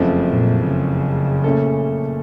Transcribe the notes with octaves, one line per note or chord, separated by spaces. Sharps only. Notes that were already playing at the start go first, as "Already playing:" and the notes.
Already playing: F#1 F2 C#3 F3 A3
A#2
C#3
A#2 A3 C#4 A4